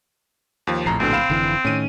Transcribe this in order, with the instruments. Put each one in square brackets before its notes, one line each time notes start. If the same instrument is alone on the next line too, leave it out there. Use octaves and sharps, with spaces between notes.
[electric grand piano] D#2 F3
[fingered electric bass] A#1 A2 [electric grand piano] F2 A#5 C7
[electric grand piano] D2 B2 D3 [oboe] C4
[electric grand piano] F5 B5 E7
[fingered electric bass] F1 D3 E3
[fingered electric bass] A2 D#3 [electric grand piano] C#4 D#7